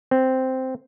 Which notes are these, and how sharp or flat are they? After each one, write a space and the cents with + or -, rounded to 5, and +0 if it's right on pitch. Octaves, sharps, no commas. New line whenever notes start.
C4 -5